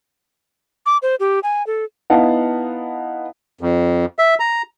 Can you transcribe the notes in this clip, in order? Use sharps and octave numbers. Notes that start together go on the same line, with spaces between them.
D6
C5
G4
G#5
A4
B3 D#4 E4 F5 F#5 A5
F2
E5
A#5